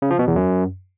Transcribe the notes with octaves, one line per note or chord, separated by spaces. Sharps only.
C#3
F3
B2
E2
F#2